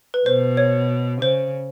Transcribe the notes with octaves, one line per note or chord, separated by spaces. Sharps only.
B4
B2 C5
C#5
C#3 C5